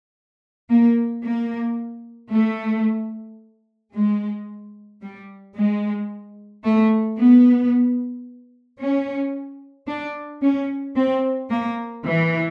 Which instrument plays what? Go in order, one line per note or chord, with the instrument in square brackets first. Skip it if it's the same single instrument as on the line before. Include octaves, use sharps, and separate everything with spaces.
[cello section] A#3
A#3
A3
G#3
G3
G#3
A3
B3
C#4
D4
C#4
C4
A#3
E3